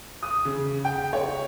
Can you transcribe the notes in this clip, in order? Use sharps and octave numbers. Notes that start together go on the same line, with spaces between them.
D#6
C#3
G5
C#5